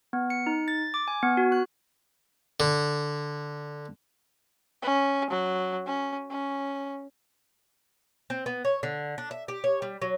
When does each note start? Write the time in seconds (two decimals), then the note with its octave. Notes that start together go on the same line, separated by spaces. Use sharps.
0.13 B3
0.30 C#7
0.46 D#4
0.68 A6
0.94 D6
1.08 G#5
1.23 B3
1.37 F#4
1.52 F#6
2.60 D3
4.82 C#4
5.30 F#3
5.86 C#4
6.31 C#4
8.30 C4
8.46 B3
8.65 C#5
8.83 D3
9.18 D4
9.31 E5
9.48 G4
9.64 C#5
9.82 G3
10.02 F#3